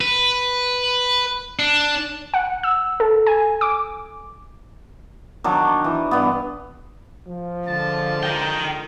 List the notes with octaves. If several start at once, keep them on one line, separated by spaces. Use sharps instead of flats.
B4
D4
F#5
E6
A4
G#5
D6
D#3 F#3 D4
E3
G2 B3
F3
D3 G#3 F4 A5
A#4 G5